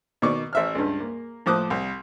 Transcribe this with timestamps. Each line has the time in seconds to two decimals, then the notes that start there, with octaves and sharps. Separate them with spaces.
0.22 B2 D#3 D5 C#6 D6
0.53 A1 E5 F6
0.75 C#2 G2
1.00 A#3
1.46 A2 F3 C5 D6 D#6 F#6
1.70 C2